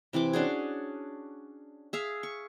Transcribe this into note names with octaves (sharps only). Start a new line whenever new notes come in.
C3 E3 C4 D6
C#4 D4 F#4 G#4
G#4 E5 F5
C#6